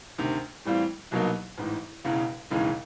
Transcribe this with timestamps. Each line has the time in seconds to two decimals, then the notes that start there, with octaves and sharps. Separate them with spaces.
0.18 D2 C3 D#3
0.65 A2 E3 G3 C4 F4
1.11 C2 B2 F#3 A#3 D#4
1.58 A1 G#2 E3
2.04 E1 E2 C#3 E3
2.50 E1 D#2 C#3 E3 G#3